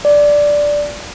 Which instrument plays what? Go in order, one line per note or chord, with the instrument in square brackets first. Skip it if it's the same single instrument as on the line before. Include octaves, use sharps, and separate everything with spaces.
[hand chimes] D5